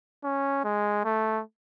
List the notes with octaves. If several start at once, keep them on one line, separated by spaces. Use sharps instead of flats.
C#4
G#3
A3